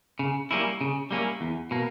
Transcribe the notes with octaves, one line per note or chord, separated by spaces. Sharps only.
C#3
G3 A#3 C#4 E4
C#3
G3 A#3 C#4 E4
E2
B2 A#3